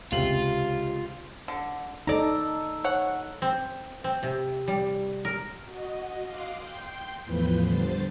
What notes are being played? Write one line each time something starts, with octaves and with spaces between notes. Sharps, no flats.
C#2 C3 F4 F#7
D3
D#4 A4 D5 A#5
C#5 F#5
C4
C4
C3
G3
A#4
F#4 D#5
F5 C6 D6 D#6 F#6
G5 C6 G6
E2 A2 F3 B4 B5 G6
D3 G3 C5 A6 C7